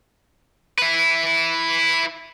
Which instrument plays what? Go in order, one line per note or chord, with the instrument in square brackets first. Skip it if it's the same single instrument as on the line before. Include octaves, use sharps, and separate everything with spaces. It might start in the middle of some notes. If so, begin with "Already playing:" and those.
[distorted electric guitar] E4 B4